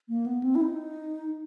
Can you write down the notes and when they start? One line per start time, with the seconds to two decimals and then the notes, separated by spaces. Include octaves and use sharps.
0.09 A#3
0.26 B3
0.43 C4
0.55 E4
0.61 D#4